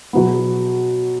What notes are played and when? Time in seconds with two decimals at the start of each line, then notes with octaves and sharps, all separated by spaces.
0.13 B2 F#3 B3